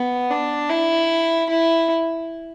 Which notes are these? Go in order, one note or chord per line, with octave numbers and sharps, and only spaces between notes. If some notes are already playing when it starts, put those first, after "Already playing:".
Already playing: B3
D4
E4
E4